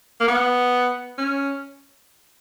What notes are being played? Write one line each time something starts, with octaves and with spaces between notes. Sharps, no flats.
A#3
B3
C#4